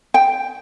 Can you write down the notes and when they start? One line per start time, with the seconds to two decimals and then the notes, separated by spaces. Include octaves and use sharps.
0.14 G5